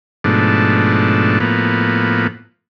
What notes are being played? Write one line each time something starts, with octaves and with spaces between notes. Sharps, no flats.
G#2 B2 F3 A3 D4
A2 F3 A#3 B3